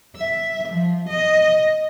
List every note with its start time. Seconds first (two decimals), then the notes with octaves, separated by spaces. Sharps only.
0.16 E5
0.69 F3
1.09 D#5